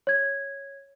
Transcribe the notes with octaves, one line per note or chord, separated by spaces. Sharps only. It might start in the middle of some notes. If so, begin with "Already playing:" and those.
C#5 G#6